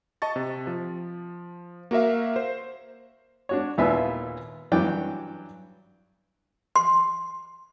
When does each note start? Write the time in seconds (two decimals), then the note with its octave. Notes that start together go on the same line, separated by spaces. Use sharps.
0.22 D#5 A5 C#6 A6
0.36 C3
0.67 F3
1.91 A#3 F#4 A#4 E5 F5
2.36 C5
3.49 D4 F#4 C#5
3.78 D#2 A#2 B3 E4 E5 G#5
4.72 G2 E3 F#3 C#5 D5 G5
6.76 C6